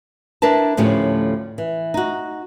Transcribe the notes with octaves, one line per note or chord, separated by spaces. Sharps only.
D4 E4 A#4 B4 A5
D2 A2 F3 C#4 G4
E3
D#4 F#4